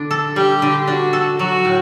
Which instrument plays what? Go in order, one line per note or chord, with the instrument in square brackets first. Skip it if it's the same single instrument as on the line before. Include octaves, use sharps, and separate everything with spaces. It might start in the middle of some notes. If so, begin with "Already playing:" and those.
Already playing: [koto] D3 D4
A4
[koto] G3 [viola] G4
[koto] D3
[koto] D4 [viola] F#4
[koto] A4
[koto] F#3 [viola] F#4
[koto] A2